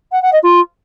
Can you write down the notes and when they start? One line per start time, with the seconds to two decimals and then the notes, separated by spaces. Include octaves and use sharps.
0.12 F#5
0.22 F#5
0.32 D#5
0.43 F4